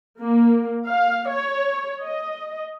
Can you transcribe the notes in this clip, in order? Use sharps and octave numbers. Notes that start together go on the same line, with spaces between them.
A#3
F5
C#5
D#5